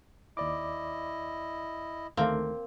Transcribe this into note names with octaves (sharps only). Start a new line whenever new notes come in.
D#2 E4 D5 D#5 D6
D2 D#3 A3 A#3 C4